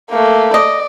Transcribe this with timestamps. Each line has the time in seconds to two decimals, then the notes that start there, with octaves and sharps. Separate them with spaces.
0.10 A3 A#3
0.54 D5 D#5